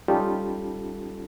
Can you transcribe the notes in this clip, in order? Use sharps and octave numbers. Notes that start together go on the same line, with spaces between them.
G3 C#4 D#4 F4 G4 A4